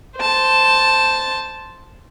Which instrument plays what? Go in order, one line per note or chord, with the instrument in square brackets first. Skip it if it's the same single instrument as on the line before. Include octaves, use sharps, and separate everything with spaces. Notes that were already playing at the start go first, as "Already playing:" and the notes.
[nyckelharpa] C5 A5